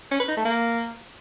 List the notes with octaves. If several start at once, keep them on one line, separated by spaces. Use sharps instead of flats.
C#4
B4
D#4
A3
A#3